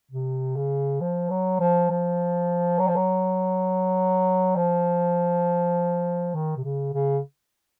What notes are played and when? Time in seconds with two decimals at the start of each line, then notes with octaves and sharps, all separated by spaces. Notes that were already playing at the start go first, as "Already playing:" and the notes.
0.11 C3
0.56 C#3
1.01 F3
1.30 F#3
1.60 F3
1.90 F3
2.79 F#3
2.88 F3
2.96 F#3
4.56 F3
6.34 D#3
6.57 C3
6.64 C#3
6.94 C#3